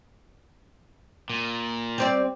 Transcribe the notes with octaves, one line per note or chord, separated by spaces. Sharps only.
A#2
G3 C4 D5